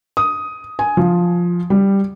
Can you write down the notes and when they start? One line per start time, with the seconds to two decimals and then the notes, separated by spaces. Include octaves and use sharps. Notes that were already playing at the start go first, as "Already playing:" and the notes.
0.17 D#6
0.79 G#5
0.97 F3
1.70 G3